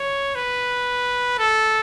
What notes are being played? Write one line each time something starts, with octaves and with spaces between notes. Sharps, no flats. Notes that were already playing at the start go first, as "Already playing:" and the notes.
Already playing: C#5
B4
A4